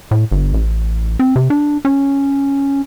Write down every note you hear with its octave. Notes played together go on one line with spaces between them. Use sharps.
A2
G1
A1
C4
C3
D4
C#4